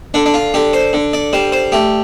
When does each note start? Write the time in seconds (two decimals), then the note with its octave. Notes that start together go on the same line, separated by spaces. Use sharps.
0.14 D3 D4
0.26 D4
0.34 F4
0.54 D3 G4
0.73 C5
0.93 D3
1.13 D5
1.33 G3 C5
1.52 C5
1.72 A3 G4